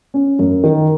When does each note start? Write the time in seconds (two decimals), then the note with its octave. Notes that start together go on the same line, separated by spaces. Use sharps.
0.14 C#4
0.39 F#2
0.64 D#3